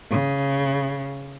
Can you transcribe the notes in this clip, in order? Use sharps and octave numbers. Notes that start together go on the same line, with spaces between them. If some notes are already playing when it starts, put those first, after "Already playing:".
C#3